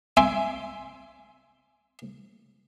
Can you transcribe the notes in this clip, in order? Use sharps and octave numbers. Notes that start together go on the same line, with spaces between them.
E5 G#5 C6 D6